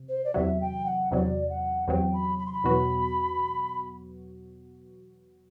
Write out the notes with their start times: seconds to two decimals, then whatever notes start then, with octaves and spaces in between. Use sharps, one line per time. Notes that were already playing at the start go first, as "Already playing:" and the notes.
Already playing: C3
0.09 C5
0.24 D5
0.34 E2 C3 F#3 E5
0.61 G5
0.86 F#5
1.11 E2 C3 F#3 D5
1.49 F#5
1.88 E2 C3 F#3 G5
2.13 B5
2.38 B5
2.46 C6
2.53 B5
2.64 E2 B2 F#3 B3 F#4